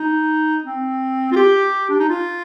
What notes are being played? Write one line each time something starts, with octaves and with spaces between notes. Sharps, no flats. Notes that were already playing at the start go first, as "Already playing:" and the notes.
Already playing: D#4
C4
F4
G4
D4
D#4
F4